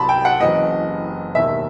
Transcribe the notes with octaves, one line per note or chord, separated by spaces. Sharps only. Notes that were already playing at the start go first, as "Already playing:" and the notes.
Already playing: C2 C3 F#3 A5 B5 C6
G5
F#5
F#1 F#2 E3 D#5
E1 D#2 D#3 E5